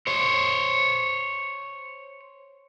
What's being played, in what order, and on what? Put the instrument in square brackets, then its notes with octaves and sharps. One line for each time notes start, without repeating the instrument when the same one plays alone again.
[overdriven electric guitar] C5 C#5